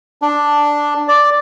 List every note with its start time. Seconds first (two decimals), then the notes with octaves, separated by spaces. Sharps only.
0.22 D4
1.08 D5